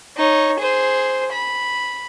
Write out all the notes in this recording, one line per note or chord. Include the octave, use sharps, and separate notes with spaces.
D#4 C#5
G#4 C5
B5